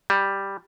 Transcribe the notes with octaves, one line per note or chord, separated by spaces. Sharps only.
G3